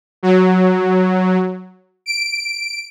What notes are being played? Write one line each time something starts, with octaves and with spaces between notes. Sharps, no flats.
F#3
D7